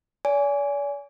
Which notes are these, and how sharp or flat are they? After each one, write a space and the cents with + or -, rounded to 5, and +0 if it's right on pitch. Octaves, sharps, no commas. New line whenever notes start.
D5 -45 G#5 +0